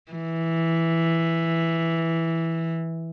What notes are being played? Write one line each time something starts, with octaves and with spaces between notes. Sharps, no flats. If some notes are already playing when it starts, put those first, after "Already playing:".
E3